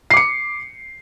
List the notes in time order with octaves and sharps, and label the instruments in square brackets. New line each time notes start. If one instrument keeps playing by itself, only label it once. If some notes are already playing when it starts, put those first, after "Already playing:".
[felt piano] C7
D6
C#7